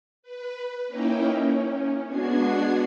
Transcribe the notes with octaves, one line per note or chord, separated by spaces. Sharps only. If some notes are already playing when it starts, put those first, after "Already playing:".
B4
A#3 C#4 D#4 E4 G5
C#4
G#3 B3 D4 F#4 G#6 C7